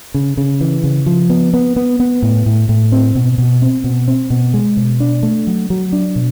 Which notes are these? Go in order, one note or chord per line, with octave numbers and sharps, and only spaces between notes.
C#3
C#3
E3
C#3
F3
B3
B3
B3
B3
A2
A2
A2
C4
B2
B2
C4
B2
C4
B2
G#3
B2
D4
A3
F#3
F#3
D4
B2